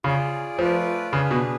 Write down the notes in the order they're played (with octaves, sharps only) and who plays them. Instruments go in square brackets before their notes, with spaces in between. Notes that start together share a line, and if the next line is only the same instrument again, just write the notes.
[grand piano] C#3 [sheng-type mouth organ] F4 G#4 D5
[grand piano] F3 [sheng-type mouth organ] A3 F4 B4 D5
[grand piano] C#3 [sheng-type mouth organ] D4 G#4 B4
[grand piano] B2